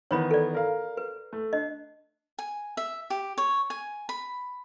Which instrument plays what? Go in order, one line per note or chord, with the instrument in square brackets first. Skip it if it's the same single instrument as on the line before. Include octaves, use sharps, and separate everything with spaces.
[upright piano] D#3 E3 B3 [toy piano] C#5 B5 D#6
[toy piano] A4 D5
[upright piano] A#4 F5
[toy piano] B4
[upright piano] A3
[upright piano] D4 [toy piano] D#5
[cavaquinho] G#5
E5
G4
C#5
G#5
B5